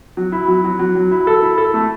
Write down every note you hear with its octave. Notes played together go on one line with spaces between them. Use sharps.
F#3
E4
F#3
F#3
F#3
F#3
E4
A4
E4
A4
A3